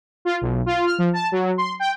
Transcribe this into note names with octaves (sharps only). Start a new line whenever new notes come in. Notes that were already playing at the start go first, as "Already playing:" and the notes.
F4
B1
F4
F6
F3
A5
F#3
C6
G5